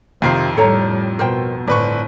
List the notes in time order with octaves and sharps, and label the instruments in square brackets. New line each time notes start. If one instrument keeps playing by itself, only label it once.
[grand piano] F2 D#3 C7 [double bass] C3 [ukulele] F4
[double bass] A2 G3 [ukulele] A4 C#5 A#5
[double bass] B2 [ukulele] A#4 C5 G5
[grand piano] G1 B4 C#6 [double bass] A2 C4 [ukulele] D5